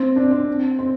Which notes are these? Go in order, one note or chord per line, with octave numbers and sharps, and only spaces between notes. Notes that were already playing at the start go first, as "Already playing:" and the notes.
Already playing: C4
D4
C4
C4